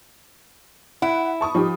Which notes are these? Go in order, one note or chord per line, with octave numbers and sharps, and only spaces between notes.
E4 F#5
A5 C#6 D#6
F3 D#4 G4